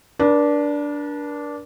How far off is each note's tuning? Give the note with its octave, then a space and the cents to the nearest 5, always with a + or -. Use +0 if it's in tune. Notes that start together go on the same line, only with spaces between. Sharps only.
D4 -10 A#4 +45